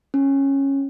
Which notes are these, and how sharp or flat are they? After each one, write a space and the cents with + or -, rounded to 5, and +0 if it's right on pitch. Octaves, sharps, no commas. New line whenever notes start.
C#4 -15